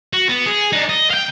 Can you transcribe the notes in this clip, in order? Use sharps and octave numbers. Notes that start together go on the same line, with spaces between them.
F#4
B3
G#4
D4 D#4
D#5
F5 G5